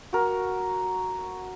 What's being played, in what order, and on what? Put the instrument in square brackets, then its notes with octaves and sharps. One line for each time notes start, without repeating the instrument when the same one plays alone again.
[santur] F#4 A#4